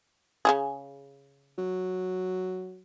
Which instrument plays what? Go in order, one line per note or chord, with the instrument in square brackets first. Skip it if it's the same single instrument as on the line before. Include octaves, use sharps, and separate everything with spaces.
[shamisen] C#3 G3 G#4
[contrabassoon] F#3